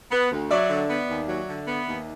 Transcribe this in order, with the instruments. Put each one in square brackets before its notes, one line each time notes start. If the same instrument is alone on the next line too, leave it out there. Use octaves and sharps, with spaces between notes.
[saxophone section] B3
D2
[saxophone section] F#3 [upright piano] D5 E5
[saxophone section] D3
B3
D#2
F#3
D3
B3
D#2